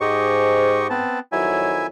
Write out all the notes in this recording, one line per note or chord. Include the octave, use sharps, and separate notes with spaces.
G#2 G4 D#5 C#6
B3 C4 A5
F2 D#3 F#3 E4 E5 G#5